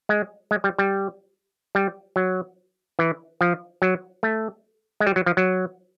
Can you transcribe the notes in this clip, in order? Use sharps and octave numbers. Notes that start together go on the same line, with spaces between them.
G#3
G#3
G3
G3
G3
F#3
E3
F3
F#3
A3
G#3
G3
F#3
F3
F#3